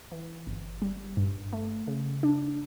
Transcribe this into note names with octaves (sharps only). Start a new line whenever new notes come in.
E3
G1
G3
G2
A3
C#3
D4